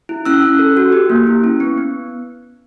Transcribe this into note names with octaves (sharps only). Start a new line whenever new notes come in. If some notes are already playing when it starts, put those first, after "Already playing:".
E4
C#4 E6 F#6
C#4
A4
F#4
G4
A#3
E4
C#4
B3
B3